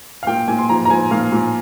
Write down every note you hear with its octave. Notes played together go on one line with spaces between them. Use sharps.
F5
A#2 G5
A#2 G#5
C6
F3 A#5
A#5
F3 G#5
A#2 F5
A#2